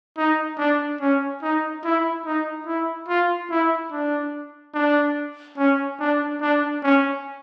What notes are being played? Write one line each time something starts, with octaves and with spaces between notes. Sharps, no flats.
D#4
D4
C#4
D#4
E4
D#4
E4
F4
E4
D4
D4
C#4
D4
D4
C#4